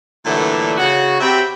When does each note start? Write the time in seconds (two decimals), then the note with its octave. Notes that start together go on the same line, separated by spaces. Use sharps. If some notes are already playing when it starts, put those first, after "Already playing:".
0.25 A#2 D3 E3 F#3 G3 A3
0.77 C#3 F#4
1.20 C3 C4 G4 E5 G5 B5